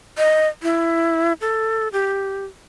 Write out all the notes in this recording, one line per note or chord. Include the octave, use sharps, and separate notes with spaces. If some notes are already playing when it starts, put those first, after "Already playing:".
D#5
E4
A4
G4